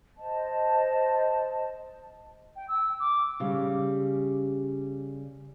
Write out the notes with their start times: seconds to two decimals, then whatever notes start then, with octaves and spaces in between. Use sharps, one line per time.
0.17 C5 D#5 A5
2.56 G5
2.68 E6
3.00 D6
3.40 C#3 G3